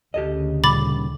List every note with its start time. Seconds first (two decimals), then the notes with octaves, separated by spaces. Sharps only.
0.14 D2 C#3 G4 A4 D#5
0.64 A#2 D#3 G3 B5 D6 A6